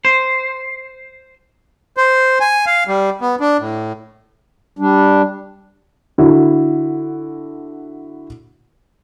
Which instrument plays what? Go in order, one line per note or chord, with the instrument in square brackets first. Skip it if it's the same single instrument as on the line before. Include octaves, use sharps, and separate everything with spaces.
[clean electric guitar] C5
[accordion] C5
G#5
F5
G3
B3
D4
A2
[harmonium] G3 D4
[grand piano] D3 E4 F#4